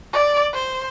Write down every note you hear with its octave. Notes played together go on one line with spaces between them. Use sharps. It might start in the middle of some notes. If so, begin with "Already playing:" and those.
D5
C5